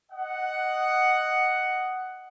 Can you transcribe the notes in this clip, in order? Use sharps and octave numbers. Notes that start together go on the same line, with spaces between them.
D#5 F#5